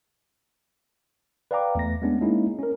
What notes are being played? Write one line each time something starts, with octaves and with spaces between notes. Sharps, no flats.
B4 D5 F5 G5 A#5 D6
E2 A3 A#6
G#3 A3 B3 C#4 D4
G#3 A#3 C#4 D#4 E4
C#4 A#4